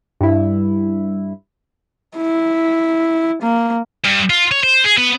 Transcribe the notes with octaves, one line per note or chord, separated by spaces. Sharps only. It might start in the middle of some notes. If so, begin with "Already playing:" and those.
G2 E4
E4
A#3
G2
F4
C#5
C5
G#4
B3